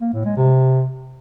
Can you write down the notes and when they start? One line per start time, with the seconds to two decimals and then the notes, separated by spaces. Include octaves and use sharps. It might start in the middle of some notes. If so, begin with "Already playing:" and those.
0.01 A#3
0.13 A2
0.25 G#3
0.37 C3